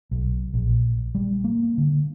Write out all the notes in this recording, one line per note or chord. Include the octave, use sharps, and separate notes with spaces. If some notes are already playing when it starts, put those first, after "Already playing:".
B1
A#1
G3
A#3
D3